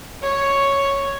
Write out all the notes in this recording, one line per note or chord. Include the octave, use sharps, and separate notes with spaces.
C#5